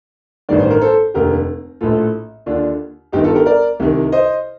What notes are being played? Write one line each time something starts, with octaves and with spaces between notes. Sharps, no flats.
A1 G2 D#3 D5
C5
A#4
A4 C5
F1 D#2 D3 G4 A#4
A#1 A2 F4 A4
D#2 D3 D4 F4
G1 G2 D#3 D#4 G4
F4 A4
G4 A#4
A#4 D5
C2 C3 D#3
C5 D#5